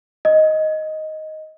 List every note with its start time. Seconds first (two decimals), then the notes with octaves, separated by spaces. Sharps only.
0.25 D#5